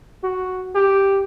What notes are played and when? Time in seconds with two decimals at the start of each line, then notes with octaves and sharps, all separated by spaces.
0.23 F#4
0.75 G4